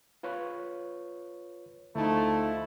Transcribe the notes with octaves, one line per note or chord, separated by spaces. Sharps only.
F4 B4 C#5
D2 F3 A3 D#4 E4